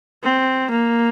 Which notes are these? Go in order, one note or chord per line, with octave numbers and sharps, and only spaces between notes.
C4
A#3